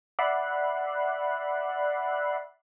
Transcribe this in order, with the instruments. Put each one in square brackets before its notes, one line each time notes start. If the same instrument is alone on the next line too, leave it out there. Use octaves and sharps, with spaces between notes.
[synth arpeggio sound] D5 E5 F#5 B5 F#6 C7